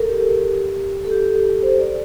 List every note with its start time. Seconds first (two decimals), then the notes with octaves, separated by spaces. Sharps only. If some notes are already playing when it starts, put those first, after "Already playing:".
Already playing: A4 A#4
0.09 G4
1.05 A4
1.11 G4
1.63 C5
1.79 D5